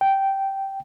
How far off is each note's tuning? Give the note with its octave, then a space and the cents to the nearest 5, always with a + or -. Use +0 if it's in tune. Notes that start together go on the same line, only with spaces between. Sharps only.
G5 -10